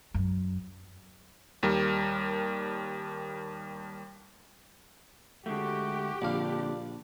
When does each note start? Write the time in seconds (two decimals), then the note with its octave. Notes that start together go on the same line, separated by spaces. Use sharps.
0.14 F#2
1.63 D#2 G3 A#4
5.46 D3 G#3 A3 F#4 G4
6.22 A#1 A#2 D3 D4 F5